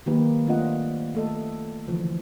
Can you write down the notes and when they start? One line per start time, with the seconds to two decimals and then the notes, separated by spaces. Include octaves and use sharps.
0.06 D#3 F#3 A#3 D#4 G4 B4
0.47 A3 C4 D4 F4 D#5 F#5
1.15 A3 A4 D#5
1.88 D3 E3 F3